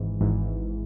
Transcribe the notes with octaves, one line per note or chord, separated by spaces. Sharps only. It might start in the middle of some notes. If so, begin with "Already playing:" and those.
Already playing: G#1 G#2 E3
G#1 G#2 E3